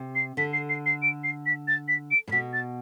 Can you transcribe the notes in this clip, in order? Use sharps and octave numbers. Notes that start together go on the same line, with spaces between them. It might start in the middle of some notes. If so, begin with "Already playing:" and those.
Already playing: C3
C7
D3 B6
C7
C7
C7
D7
C7
B6
A6
B6
D7
A2
B2 B6
A6